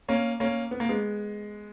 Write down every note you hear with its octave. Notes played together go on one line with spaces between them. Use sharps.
A#3 C#4
A#3 C#4
B3
A#3
G#3 B3